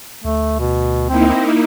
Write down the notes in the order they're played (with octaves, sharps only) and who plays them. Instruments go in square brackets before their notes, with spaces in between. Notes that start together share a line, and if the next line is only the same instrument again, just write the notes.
[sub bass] D2 [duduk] A3
[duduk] B2
[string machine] A#3 D#4 E4 [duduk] C4